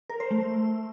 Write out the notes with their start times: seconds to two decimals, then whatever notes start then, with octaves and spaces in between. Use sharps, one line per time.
0.10 A#4
0.20 C5
0.31 A3